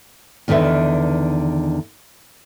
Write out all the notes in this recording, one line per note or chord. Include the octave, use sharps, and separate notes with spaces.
E2 D3 D#3 B4 E5